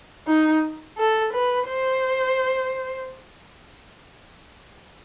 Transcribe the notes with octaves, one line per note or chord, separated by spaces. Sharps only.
D#4
A4
B4
C5